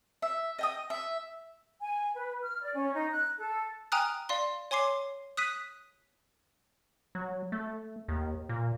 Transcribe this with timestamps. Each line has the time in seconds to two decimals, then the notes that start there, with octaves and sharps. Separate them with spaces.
0.22 E5
0.59 D#5 G5 D#6
0.90 E5
1.81 G#5
2.15 B4
2.42 F6
2.63 D5
2.74 C#4
2.94 D#4
3.12 F#6
3.39 A4
3.92 G5 G#5 A#5 D#6 F6 F#6
4.29 D5 F5 C6 G7
4.71 C#5 G#5 C6 D6 C7
5.37 D#6 F#6 B6 D#7
7.15 F#3
7.52 A3
8.08 D#2
8.49 A#2